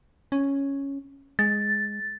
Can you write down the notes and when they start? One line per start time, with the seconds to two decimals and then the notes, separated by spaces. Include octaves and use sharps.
0.32 C#4
1.39 G#3 A6